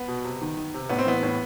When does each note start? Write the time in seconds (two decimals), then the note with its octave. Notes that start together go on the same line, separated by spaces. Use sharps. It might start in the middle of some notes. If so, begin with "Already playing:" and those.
Already playing: B3
0.08 B2
0.25 C3
0.42 D#3
0.57 D#3
0.74 C3
0.89 A2 B3
0.99 C4
1.06 E3 B3
1.23 A2